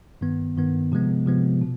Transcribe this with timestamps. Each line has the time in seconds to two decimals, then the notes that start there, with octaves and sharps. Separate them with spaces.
0.21 G2 D#3 B3
0.57 G2 D#3 B3
0.92 C3 F3 G#3 B3
1.26 C3 F3 G#3 B3
1.61 B2